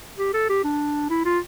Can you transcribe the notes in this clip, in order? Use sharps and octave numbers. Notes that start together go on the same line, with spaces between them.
G4
A4
G4
D4
E4
F4